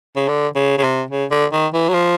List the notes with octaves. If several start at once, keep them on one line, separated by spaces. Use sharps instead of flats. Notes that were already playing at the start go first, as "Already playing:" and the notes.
C#3
D3
C#3
C#3
C3
C#3
D3
D#3
E3
F#3
F3